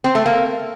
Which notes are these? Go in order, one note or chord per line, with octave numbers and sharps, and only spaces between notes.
C4
A3
A#3